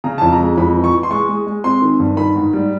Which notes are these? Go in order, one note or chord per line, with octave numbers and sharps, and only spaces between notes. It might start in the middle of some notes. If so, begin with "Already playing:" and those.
C#3 A#5
F2 A5
A#5
G#3
F2 B5
E3
C#6
E3
C6
G#3 C#6
G#3
G#3
C4 C6
D#3
G2
D#3 B5
G#2
G3